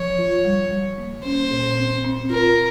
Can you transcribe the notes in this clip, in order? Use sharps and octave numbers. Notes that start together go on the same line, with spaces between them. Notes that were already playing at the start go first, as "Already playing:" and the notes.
Already playing: F3 C#5
F4
G3
G3
A#3
C#4 C5
A#2
C4
C4
F4 A#4